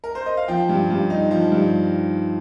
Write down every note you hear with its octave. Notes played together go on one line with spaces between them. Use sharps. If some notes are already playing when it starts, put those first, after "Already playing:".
A#4
C5
D#5
F5
F3 G5
G2
G2
D#4
F3
G2